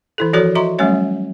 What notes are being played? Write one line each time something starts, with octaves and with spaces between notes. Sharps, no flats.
E3 E4 A4
F3 F#4 A4 A#4 C#5 D5
F#4 D#5 E5 A#5 C6 C#6
F#3 G3 A3 C#4 C#5 E5